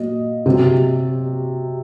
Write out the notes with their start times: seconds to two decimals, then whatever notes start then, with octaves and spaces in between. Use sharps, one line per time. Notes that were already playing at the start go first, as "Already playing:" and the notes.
Already playing: A#2 F#3 D#5
0.46 C3 F#3